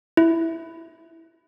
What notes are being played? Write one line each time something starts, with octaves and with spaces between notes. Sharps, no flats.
E4